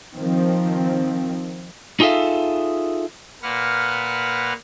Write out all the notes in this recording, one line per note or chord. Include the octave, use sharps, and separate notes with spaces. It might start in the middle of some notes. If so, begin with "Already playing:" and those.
D#3 F3 C4
D#4 F4 G#4 A4 E5 F5
A#2 A#3 B4 F#5 F6